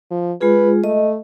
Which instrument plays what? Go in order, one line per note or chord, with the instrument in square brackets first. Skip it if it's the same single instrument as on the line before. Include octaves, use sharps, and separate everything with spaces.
[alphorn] F3
[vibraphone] G#3 F4 G#4 [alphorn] B4
[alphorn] A3 [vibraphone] D#5